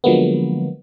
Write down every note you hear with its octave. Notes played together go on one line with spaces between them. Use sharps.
D3 F3 F#3 G#3 A#3 B3